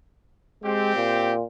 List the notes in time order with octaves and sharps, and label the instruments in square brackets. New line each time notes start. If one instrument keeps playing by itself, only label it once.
[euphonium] G#3 [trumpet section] C4 G4
[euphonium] A#2